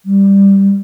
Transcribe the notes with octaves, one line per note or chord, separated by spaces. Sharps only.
G3